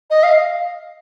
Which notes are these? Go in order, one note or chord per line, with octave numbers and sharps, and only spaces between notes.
D#5
F5